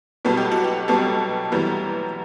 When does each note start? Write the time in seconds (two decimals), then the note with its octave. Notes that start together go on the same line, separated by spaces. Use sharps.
0.25 B1 B2 G3 B3 A4
0.37 G4
0.52 F#4
0.64 G4
0.88 B1 B2 G3 B3 A4
1.52 F#2 E3 G3 B3